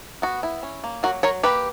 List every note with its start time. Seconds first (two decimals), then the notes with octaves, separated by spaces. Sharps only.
0.22 B3 F#4
0.43 E4
0.63 C#4
0.84 A#3
1.03 F#3 F#4 A#4
1.23 F#3 A#4 C#5
1.43 A#3 G4 B4